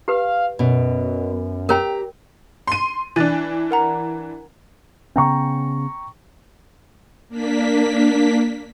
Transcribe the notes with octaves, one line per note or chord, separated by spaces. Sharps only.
G4 B4 F5
F#2 B2
G4 A#4 C#5 G5 A#5
C6 D#7
E3 D4 F#6 A6 D#7
A#4 F#5 A#5
C#3 B3 C#4 G5 A#5 C#6
A#3 D4 B6